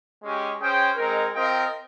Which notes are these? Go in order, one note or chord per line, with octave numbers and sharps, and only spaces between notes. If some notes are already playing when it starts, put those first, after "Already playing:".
G#3 C#4 G4
C#4 G#4 C5 G5
G#3 C4 D#4 A#4
C4 F4 A#4 D#5 G5